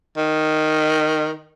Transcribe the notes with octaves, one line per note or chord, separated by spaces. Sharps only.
D#3